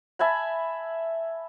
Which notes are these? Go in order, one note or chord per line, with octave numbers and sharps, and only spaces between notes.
E5 G#5 A5 B5